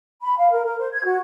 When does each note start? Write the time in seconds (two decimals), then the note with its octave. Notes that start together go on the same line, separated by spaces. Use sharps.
0.22 B5
0.38 F5
0.51 A#4
0.65 A#4
0.79 C5
0.92 G#6
1.05 F#4